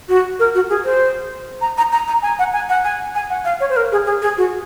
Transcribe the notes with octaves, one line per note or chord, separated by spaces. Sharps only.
F#4
A#4
F#4
G#4
C5
A#5
A#5
A#5
A#5
G#5
F#5
G#5
F#5
G#5
G#5
F#5
F5
C#5
C5
A#4
G#4
G#4
G#4
F#4